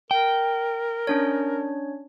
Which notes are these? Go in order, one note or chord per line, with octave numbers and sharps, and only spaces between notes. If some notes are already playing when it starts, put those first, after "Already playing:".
A#4 G5
C#4 D4 C#5